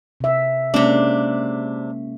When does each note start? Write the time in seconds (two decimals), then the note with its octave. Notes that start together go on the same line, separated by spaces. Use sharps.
0.21 C3 E5
0.74 C3 G#3 A#3 C#4 D4